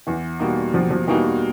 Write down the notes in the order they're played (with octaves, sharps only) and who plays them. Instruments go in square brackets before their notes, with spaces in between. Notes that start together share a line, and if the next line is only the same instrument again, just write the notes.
[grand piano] E2 [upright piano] E3
[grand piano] B2 G3 A#3 D#4
[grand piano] E2 [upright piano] F3
[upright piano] F3
[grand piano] B2 G3 A#3 D#4 [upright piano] E3